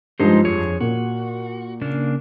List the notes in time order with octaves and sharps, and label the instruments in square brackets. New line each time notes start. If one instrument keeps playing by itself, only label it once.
[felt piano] G2 F3 [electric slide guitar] G#3 D#4 C5
[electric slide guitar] F2 G#4 C#5
[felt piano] A#2 [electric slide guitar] F#4
[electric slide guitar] C#3 A#3 D4